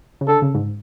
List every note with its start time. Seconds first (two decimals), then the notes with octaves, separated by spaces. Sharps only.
0.21 C#3
0.28 D3 A4
0.42 C#3
0.55 G#2